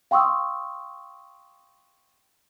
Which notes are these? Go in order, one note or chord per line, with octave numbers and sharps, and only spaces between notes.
F5 G5 C6 C#6 D#6 E6